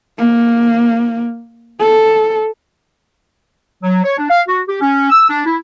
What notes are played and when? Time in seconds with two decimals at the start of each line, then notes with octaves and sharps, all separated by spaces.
0.18 A#3
1.80 A4
3.83 F#3
4.04 C#5
4.18 D4
4.30 F5
4.48 F#4
4.68 G4
4.81 C#4
5.10 E6
5.28 D4
5.46 E4